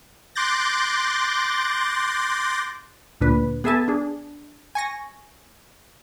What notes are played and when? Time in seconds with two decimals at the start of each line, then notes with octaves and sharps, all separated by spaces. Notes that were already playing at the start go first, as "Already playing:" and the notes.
0.35 C6 D6 F#6 G6 A6 A#6
3.21 D2 A#2 D4 B4
3.64 B3 G#4 A4 E5 G#5 A5
3.88 D4 G#4
4.75 G#5 C#6 A#6